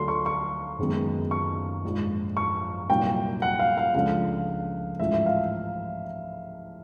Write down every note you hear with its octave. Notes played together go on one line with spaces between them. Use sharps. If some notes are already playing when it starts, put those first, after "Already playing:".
Already playing: D2 D3 F#3 A3 C6
C#6
C#6
F#1 F#2 D#3 G#3 B3
C#6
A#1 G#2 F3
C#6
C2 A#2 F#3 A#3 D#4 G5
F#5
F5
F5
C#2 C#3 F3 A3 D4 F5
A1 G#2 F3 E5
E5
F5